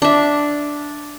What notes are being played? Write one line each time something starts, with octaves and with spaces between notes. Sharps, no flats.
D4 E5